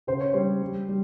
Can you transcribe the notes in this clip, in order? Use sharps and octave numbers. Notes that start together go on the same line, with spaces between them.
C#3 C5
C#5
G3 C5
G3
G3